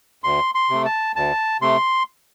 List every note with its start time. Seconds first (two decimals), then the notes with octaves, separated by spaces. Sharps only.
0.24 D2 C6
0.55 C6
0.70 C3 A3
0.85 A5
1.16 D2 A5
1.61 C3 A3 C6